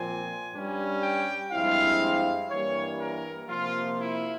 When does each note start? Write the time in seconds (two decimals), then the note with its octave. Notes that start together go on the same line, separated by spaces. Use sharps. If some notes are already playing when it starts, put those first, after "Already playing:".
Already playing: A#2 F3 C4 G#5
0.53 G2 G3 C#4
1.02 G5
1.51 G2 F3 G#3 C4 E4 F5
2.50 G2 E3 G3 A#3 C#5
3.00 A#4
3.49 C3 F3 A#3 F4
3.98 E4